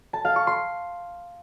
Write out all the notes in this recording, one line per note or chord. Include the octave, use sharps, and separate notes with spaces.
A5
F5
C#6
C6